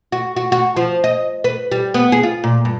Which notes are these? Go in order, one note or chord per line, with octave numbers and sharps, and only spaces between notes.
F#4
F#4
F#4
F3
D#5
B4
G3
B3
G#4
F4
A#2
G2